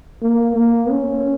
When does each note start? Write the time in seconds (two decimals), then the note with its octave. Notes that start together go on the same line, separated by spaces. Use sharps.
0.22 A#3
0.56 A#3
0.90 C#4